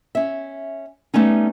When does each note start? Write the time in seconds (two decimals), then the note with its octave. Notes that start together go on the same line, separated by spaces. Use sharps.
0.15 C#4 E5
1.14 G3 A3 B3 C#4 D#4